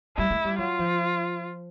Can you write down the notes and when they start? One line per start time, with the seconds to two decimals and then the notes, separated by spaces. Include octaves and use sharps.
0.17 G3 E4
0.30 G#3
0.45 G3
0.58 F#3 F4
0.79 F3